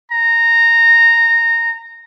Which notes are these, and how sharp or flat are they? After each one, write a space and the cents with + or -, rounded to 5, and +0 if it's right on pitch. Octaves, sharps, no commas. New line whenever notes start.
A#5 -15